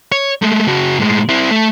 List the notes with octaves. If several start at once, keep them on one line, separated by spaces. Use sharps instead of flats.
C#5
G#3 A3
C#3 F#4
A2 G#3
C4 E4
A3